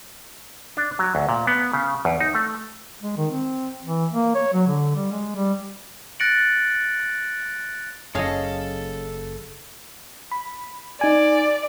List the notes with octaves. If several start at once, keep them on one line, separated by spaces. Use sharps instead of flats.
D4
F#3
D2
A#2
B3
C#3
E2
D#4
A3
G#3
D#3
C4
E3
A#3
C#5
F#3
D3
G3
G#3
G3
F#6 A6 A#6 C#7 D7 F#7
F#1 F#2 C#4 G#4 A4 D#5 F5
B5
D#4 D5 G#5